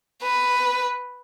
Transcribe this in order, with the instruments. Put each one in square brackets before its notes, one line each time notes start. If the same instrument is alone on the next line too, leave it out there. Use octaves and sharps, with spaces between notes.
[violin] B4